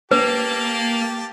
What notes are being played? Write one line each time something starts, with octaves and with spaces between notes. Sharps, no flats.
A#3 G4 B4 A5